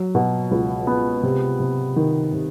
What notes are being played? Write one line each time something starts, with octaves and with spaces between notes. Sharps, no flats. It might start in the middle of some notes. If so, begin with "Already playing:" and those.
Already playing: F#3
B2
C#2
B3
C3
C3
D#3
C3